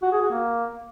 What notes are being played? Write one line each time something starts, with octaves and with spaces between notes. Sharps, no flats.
F#4
G#4
F#4
A#3